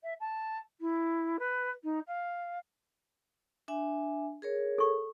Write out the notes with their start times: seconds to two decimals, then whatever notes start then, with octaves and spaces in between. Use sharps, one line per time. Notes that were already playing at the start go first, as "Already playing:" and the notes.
0.03 E5
0.20 A5
0.80 E4
1.38 B4
1.83 D#4
2.07 F5
3.68 D4 E5 G#5
4.42 G#4 A#4 C#5
4.78 A4 C#6